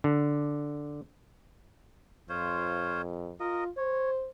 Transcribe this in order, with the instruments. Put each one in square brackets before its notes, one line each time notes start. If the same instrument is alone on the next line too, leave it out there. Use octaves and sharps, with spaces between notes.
[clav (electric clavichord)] D3
[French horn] F2 [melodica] F4 C5 C#5
[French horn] F4 [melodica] A#4 D#5
[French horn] C5 [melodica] C#5